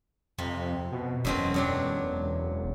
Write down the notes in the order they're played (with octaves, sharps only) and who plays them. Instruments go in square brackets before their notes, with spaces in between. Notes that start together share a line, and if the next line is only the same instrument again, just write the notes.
[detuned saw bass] F2 [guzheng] C3
[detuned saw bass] B2
[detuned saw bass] E1 [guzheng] F#2 B2 C4
[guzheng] F#2 F#3 D4